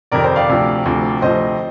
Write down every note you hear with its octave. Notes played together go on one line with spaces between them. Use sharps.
F2 C3 D#3 A#4 D5
C5
D5 F5
D2 C3 F3
D2 C3 F3
D2 C3 F3 C5 D#5